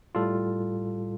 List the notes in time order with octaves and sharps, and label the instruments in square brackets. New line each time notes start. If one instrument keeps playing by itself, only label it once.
[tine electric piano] A2 G3 F4 A4